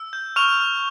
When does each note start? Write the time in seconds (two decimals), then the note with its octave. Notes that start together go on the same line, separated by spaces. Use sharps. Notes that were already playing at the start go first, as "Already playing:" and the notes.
Already playing: E6
0.13 G6
0.36 C#6 F6 F7
0.60 F6